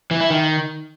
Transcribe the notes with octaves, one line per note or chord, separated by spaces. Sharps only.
E3
E4
D#3